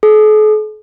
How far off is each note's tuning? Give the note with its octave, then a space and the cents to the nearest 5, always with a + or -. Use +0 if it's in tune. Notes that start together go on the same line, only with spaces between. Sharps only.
A4 -45